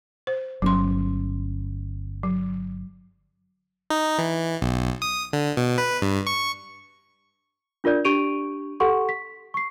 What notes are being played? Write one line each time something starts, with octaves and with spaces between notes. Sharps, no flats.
C5
G1 F#3 C4 C#4 C6
F#3
D#4
E3
B1
D#6
D3
B2
B4
G2
C#6
D4 F4 A#4 D5 G6
D4 G4 C#6 D7 D#7 F7
G4 A4 F#5 C6 C#6
B6
C#6 C7